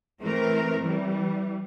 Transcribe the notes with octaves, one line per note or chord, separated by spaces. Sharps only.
E3 A3 C4 A#4
E3 G3